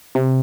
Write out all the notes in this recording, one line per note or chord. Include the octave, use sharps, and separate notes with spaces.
C3